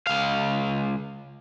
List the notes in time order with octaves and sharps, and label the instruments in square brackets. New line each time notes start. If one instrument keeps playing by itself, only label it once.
[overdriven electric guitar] C#2 F5